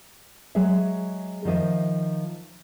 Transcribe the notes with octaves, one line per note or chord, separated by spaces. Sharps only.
F#3 G#3 G#4 E5
D#3 F3 D#5 E5